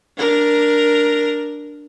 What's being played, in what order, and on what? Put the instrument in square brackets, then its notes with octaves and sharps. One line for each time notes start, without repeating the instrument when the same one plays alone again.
[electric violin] D4 A#4